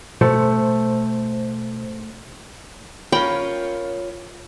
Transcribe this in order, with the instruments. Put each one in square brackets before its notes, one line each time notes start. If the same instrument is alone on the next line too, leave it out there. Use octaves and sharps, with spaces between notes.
[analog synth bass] B2 [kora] A3 [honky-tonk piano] C5 C#7
[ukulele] C#4 A#4 B5 [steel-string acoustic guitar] F4 C#5 [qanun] G5